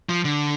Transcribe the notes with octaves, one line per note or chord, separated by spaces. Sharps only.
F3
D3